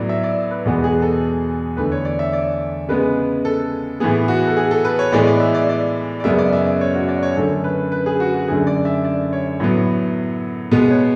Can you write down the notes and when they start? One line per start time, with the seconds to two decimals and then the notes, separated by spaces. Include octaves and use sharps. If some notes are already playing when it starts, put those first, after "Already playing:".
Already playing: A2 F#3 B3 D5
0.09 E5
0.23 D5
0.51 B4
0.65 E2 B2 G#3 B3 F#4
0.84 G#4
1.02 A4
1.77 E2 D3 A3 B4
1.92 C#5
2.05 D5
2.19 E5
2.33 D5
2.88 C#3 G#3 B3 B4
3.45 A4
4.00 A2 E3 B3 G#4
4.28 F#4
4.47 A4
4.57 G#4
4.71 A4
4.85 B4
4.99 C#5
5.12 A2 E3 G#3 B3 D5
5.27 D5
5.40 E5
5.54 D5
5.69 D5
6.20 D5
6.24 F#2 C#3 G#3 B3 E5
6.38 D5
6.53 E5
6.66 D5
6.81 C#5
6.95 F#4
7.08 D5
7.23 C#5
7.36 F#2 D3 A3 A4
7.64 B4
7.92 B4
8.06 G#4
8.20 F#4
8.34 F#4
8.48 F#2 D3 A3 G#4
8.67 D5
8.85 E5
9.04 D5
9.33 C#5
9.60 A2 F#3 B3
10.71 B2 G#3 B3 B4
10.90 C#5